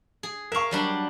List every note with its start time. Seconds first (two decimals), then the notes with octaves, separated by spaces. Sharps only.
0.23 G#4
0.52 A#4 E5 F5 C#6
0.71 F#3 G3 D4